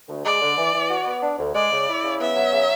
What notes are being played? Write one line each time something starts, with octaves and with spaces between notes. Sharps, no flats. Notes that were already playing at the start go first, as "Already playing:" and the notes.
D2
G#3 D5
D3
E3
E3
F#4
B3
D4
D2
G#3 D5
C#3
E4
C#3
B3 E5
F#3
C#3